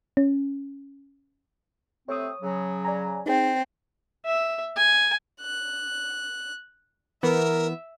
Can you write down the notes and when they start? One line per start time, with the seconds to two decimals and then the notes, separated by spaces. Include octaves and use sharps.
0.17 C#4
2.08 C3 A3 C4 C#5 D#6
2.42 C#3 F#3
2.85 D5 G#5 A#5
3.26 C4 D#4 G#4 G5
4.26 E5
4.76 G#5
5.41 F#6
7.23 E3 B3 A#4 E5